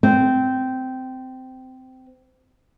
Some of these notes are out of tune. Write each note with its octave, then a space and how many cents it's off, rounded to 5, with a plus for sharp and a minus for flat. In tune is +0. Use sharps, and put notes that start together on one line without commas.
C4 -15